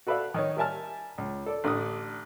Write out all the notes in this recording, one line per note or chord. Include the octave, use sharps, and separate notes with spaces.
F#4 A4 B4 D5 E5 F5
D#3 D#4 C#5
G3 A#4 E5 G#5 A5 F6
C#2
A4 D5
A1 D3 D5 D#6